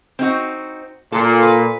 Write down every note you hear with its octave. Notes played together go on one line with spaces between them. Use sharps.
C4 D#4 F#4
A#2 A4
B4